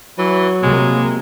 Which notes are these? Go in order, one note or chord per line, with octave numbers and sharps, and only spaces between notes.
E3 F#3
C3 G#3 A#3